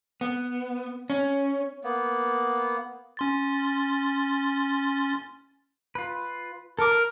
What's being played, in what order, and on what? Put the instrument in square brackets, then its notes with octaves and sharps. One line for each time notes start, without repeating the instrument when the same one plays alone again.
[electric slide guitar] B3
C#4
[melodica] A#3 B3
[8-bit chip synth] C#4 C6 A6
[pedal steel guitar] F4 B4
[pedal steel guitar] A4 D6 [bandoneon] A#4
[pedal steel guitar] A#5